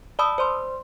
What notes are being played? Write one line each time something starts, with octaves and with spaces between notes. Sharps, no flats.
D5 A5 B5 D#6 E6
C5 D5 C6